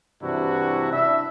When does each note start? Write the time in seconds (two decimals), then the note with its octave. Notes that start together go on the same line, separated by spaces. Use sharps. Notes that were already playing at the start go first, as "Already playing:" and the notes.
0.22 G2 C3 E3 D4 E4 F#4
0.92 D4 E4 E5